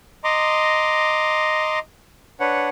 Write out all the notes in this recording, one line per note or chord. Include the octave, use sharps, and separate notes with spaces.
D#5 A#5 C6 D6
D4 B4 C#5 F#5